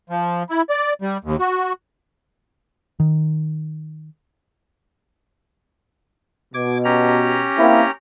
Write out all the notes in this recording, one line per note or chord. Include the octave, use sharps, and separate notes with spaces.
F3
E4
D5
G3
D#2
F#4
D#3
B2 D6 G#6
C#4 G4 A#5
A#3 C4 E4